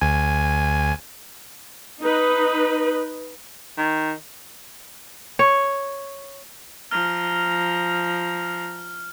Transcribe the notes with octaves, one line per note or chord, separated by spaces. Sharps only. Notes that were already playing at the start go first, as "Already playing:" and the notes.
D2 G#5
D#4 B4
D#3
C#5
F3 A#5 F6